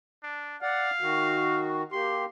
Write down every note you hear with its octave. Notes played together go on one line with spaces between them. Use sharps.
D4
D5 F5 F#5
D#3 F#4
A#3 G4 C6